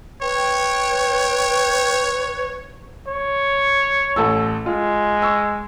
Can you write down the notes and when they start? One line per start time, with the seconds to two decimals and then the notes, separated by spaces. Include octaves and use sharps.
0.22 B4 C#5 G5
3.08 C#5
4.16 A1 A4 E6
4.66 G#3 F4
5.22 C#6 E6